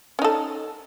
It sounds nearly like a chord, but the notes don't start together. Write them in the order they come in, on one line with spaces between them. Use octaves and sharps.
C#4 D#4 A4